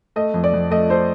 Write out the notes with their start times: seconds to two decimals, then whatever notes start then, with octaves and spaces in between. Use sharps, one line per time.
0.16 A3 D#5
0.34 F2
0.44 D5
0.53 F2
0.71 A3 D#5
0.90 A3 C5